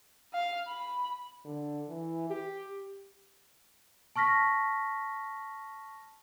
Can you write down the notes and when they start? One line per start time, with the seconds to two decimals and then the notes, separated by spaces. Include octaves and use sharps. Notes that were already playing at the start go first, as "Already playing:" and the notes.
0.34 F5
0.68 B5
1.45 D3
1.89 E3
2.30 G4
4.16 A5 C#6 F6 A#6 B6